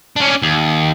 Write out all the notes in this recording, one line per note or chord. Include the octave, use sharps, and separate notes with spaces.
C#4 D4
D#2